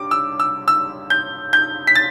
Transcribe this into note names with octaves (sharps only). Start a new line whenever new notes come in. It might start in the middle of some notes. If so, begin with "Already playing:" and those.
Already playing: G2 G3 D6
E6
E6
E6
G6
G6
B6
A6